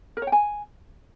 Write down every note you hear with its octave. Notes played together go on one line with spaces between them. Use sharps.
A#4
C#5
G5
G#5